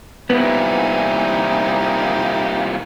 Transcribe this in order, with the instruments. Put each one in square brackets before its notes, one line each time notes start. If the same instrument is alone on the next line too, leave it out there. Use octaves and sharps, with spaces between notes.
[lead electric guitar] C2 A#2 [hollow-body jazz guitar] B3 [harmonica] D#4 E4 G4